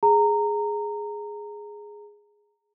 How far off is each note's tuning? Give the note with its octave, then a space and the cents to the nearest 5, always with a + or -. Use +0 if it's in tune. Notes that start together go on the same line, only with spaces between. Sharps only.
G#4 +0 A#5 -15